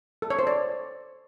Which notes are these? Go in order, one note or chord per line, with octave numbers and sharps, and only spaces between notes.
A4
C#5
C5
D5